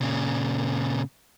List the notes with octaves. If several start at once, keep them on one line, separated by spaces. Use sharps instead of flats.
A#2 C#3